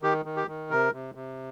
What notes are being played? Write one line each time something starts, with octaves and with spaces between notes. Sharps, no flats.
D#3 G4
D#3
G4
D#3
C3 A#4
C3
C3